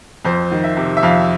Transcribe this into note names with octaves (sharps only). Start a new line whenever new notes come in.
F2 C5
D#3
E5
C3
E5
F2 F5